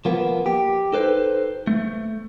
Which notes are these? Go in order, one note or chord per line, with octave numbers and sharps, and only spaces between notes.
F3 A#3 B3
G4
D#4 A4 B4 C5
A3